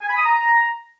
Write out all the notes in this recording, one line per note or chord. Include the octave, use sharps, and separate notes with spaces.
G#5
B5
D#6
A#5